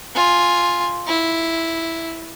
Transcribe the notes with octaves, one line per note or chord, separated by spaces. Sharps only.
F4 G#5
E4